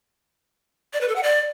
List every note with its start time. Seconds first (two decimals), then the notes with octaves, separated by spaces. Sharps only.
0.93 D5
1.01 B4
1.08 A4
1.16 F#5
1.23 D5